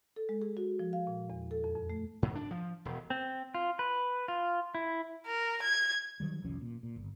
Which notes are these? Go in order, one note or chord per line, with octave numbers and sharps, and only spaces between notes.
A4
G#3
G#4
F#4
F3
F5
A#2
E2
A4
F2
F2
A3
G#2
D4
F3
E1
C4
F4
B4
F4
E4
A#4
G#6
D#3 F#3 G3
F1 C2 F3 C#4
A#2
A#2
G1